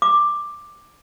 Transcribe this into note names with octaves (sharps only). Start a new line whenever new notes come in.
D6